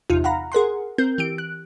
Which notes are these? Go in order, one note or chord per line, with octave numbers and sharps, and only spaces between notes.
G1 E2 C3 D#4 F4
F5 F#5 A#5 B5
G#4 A#4 F#5 C6
C4 A#4 G6
E3 G4 D7
F#6